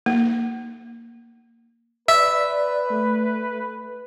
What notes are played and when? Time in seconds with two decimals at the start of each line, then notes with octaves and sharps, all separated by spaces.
0.06 A#3
2.08 B4 D5 E5
2.90 A3